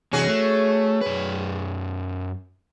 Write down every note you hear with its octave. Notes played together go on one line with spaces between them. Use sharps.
C3 E3 C#4 F#4 G#4
A3
F#2 B4